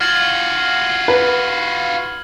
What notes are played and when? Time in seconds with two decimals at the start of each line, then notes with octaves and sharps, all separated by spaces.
0.01 F4 F#4 F6 G#6 F#7
1.08 B4